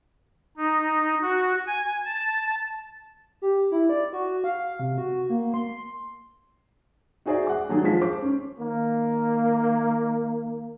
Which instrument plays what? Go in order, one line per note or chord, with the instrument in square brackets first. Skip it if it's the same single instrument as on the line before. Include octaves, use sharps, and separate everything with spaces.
[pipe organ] D#4
F#4
G#5
A5
[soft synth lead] G4
E4
D5
F#4
F5
C3
F#4
A#3
C6
[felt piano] D#4 F#4 G#4 C5 D5 E5
F#5 D6
D#3 F#3 A#3 D4 G#4 A#4
F3 G#3 F4 B6
C5 D6
C#4
[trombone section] D#3 A#3